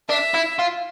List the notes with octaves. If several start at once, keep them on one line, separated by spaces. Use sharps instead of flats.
D4 E5
E4
F4